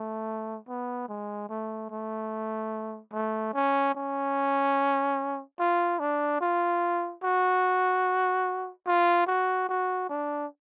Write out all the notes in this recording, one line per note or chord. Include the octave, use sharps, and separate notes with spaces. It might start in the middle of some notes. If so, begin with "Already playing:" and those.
Already playing: A3
B3
G#3
A3
A3
A3
C#4
C#4
F4
D4
F4
F#4
F4
F#4
F#4
D4